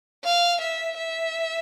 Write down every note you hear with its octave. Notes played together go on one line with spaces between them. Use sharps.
F5
E5
E5